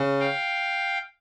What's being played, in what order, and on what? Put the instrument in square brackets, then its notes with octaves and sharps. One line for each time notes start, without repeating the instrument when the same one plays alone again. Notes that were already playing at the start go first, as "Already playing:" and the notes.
Already playing: [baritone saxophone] C#3
[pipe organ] F5 G5